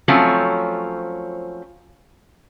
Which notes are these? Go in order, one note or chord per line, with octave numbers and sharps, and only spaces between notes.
F3 F#3 A3 C4 C#4